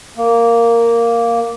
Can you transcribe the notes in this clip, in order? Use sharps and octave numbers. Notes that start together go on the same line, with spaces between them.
A#3